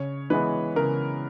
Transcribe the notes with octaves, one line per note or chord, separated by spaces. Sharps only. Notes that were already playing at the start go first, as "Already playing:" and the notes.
Already playing: C#3 C#5
E3 G#3 B3 B4
C#3 A#4